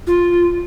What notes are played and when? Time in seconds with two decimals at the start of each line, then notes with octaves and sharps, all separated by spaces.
0.07 F4